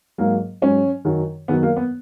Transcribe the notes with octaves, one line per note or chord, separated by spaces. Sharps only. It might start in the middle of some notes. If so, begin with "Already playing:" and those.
G#2 F#3 A#3
G#2 F#3 C#4
F#2 D#3 F#3
F#2 D#3 F#3 B3
A#3
B3